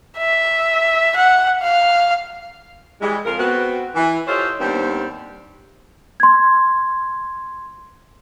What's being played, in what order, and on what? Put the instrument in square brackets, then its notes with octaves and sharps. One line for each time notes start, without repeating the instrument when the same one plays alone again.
[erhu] E5
F#5
F5
[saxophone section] E3 G3 G#3
F2 F4 A#4
B3 C4 F#4
E3
F4 G4 A4 C5 C#5 D#5
D#2 G3 B3 C4 D4 C5
[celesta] C6 G#6